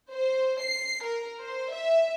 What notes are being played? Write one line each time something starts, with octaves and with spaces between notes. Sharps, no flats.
C5
C7
A#4
C5
E5